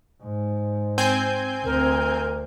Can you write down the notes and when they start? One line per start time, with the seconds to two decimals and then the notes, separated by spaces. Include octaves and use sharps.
0.23 G#2
0.98 C4 G#5 G6
1.65 D2 A#4